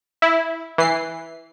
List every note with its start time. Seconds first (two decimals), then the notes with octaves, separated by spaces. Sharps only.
0.22 E4
0.78 E3 C7